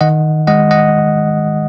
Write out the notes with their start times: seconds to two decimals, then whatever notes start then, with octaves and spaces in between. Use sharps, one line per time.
0.01 D#3 D#5 F#5
0.47 G#3 D#5 F#5
0.71 D#5 F#5